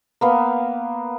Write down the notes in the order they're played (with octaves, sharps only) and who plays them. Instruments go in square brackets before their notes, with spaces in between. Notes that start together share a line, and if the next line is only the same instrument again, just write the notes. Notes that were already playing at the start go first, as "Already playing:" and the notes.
[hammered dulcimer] A#3 B3 F5